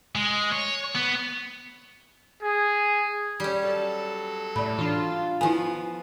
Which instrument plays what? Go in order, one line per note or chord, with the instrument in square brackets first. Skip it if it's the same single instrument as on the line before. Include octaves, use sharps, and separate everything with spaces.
[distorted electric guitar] G#3
C#5
B3
[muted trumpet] G#4
[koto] G3 C#4 [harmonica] G4
[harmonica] F#3 A4 A5
[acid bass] A2 [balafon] D5 B5
[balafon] E3 D4 [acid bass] F4
[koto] F3 B3 [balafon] E4 G#5